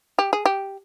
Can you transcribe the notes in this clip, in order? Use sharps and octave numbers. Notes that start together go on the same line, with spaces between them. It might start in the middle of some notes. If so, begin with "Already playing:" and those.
G4
G#4
G4